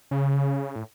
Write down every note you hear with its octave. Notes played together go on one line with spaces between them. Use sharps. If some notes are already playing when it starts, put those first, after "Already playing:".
C#3
A2